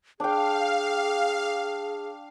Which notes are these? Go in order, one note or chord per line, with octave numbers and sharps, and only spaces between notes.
D4 G#4 F5 G5